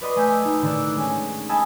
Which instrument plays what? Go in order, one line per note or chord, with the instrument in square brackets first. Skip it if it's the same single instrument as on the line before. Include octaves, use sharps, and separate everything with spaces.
[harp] B4 D5 D#5 C6 C#6
A3 G#5 E6 G6 B6
A3 D#4
A2 D3 D#3 D5 E6 F#6
G#3 C#4
D#5 G#5 A5 B5 E6